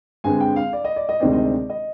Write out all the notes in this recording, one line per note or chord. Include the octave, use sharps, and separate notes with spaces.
G2 D3 G#3 C4 G#5
G5
F5
D5
D#5
D5
D#5
D2 C3 D#3 G#3 C4 D5
D#5
D5
D#5